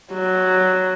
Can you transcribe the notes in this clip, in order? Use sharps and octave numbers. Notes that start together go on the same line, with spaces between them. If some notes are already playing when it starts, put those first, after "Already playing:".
F#3